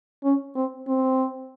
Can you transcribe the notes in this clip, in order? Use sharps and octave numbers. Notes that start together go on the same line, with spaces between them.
C#4
C4
C4